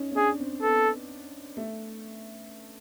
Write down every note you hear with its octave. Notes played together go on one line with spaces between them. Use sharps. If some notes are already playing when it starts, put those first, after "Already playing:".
Already playing: C#4 D#4
C#4
D4 G#4
C4
B3 A4
A3